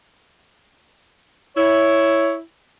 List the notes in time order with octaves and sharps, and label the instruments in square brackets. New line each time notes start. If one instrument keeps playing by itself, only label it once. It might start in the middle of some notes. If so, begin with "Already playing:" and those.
[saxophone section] E4 [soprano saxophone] C#5